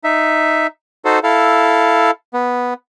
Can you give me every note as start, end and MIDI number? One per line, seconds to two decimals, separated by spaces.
0.04 0.67 63
0.04 0.67 76
1.05 1.19 63
1.05 1.19 66
1.05 1.19 69
1.05 1.19 72
1.24 2.11 64
1.24 2.11 69
1.24 2.11 77
2.34 2.74 59